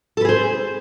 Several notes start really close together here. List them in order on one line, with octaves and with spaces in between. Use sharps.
A4 B4 G#4 C5